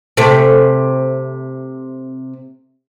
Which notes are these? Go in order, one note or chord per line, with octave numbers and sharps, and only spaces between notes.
C3 A3